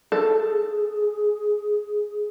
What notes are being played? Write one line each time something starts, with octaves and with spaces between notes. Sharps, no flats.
G#4 A4